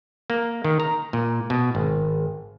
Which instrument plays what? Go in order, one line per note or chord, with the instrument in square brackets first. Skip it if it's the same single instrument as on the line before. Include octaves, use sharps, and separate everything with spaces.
[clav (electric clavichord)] A#3
D#3
A#5
A#2
B2
G#1